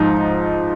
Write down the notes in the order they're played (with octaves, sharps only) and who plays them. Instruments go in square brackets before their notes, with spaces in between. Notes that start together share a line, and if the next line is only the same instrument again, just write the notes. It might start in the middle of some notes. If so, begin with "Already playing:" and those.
Already playing: [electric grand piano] G#2 F3 D#4